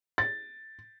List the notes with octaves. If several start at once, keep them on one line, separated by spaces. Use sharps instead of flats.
A6